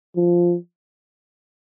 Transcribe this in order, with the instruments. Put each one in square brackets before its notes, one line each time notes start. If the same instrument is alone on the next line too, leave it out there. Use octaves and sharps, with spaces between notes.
[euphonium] F3